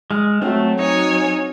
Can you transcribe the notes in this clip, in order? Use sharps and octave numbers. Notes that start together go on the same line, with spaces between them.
G#3 F6
F#3 A3 C4 F#4
D#4 C#5 G#5